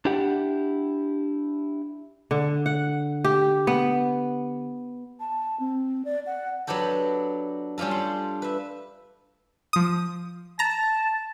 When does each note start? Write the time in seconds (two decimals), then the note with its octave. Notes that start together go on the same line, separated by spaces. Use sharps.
0.05 D4 E4 G4 F#5
2.31 D3
2.66 F#5
3.25 G4
3.67 B3
5.20 A5
5.60 C4
6.05 D5
6.26 F#5
6.67 F#3 B3 D4 G4 A4
7.78 G3 C#4 D4 F4 A4
7.91 C6
8.42 B4 E5
9.73 F3 D#6
10.59 A5 A#5 A#6